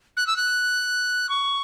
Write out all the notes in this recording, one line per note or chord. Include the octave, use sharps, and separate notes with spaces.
F#6
E6
F#6
C#6